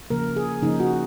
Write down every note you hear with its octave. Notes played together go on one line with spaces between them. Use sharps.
C#3 F3 A#3 A#4
G#4
C#3 F3 A#3 D#4
F#4